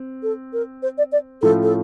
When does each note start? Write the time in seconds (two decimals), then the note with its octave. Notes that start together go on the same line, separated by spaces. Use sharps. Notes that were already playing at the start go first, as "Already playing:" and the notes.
Already playing: C4
0.23 A4
0.53 A#4
0.82 C5
0.98 D5
1.12 D5
1.42 A2 F3 A3 C#4 F4 A4
1.63 A4